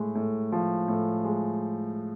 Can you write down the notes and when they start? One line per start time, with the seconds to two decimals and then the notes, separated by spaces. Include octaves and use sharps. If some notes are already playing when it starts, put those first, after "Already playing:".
Already playing: A2 G#3
0.15 A2
0.52 F3
0.88 A2
1.25 G#3